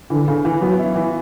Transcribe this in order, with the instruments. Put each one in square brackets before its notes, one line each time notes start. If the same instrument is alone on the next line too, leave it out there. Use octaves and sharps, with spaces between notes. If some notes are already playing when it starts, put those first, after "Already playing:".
[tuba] D3 [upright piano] E3
[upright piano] C#3
E3
[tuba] F#3 [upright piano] B3
[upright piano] E4
E3